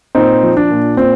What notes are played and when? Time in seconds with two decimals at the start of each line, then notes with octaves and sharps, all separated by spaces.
0.15 A#2 C4 D#4
0.43 F3
0.57 D4
0.70 A#2
0.97 A#2 C4